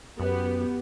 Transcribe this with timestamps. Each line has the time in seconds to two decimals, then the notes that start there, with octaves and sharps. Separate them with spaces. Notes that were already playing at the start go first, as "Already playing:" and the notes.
0.20 F#2 B3 G4